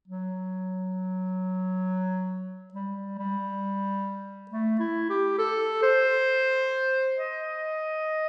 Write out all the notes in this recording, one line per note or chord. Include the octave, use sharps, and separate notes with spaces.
F#3
G3
G3
A3
E4
G4
A4
C5
D#5